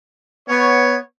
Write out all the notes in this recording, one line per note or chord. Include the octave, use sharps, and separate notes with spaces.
B3 C#5